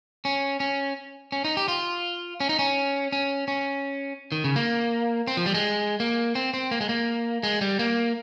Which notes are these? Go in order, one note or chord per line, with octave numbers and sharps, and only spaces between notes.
C#4
C#4
C#4
D#4
G4
F4
C#4
D#4
C#4
C#4
C#4
D#3
C#3
A#3
C4
F3
G3
G#3
A#3
C4
C4
A#3
G#3
A#3
G#3
G3
A#3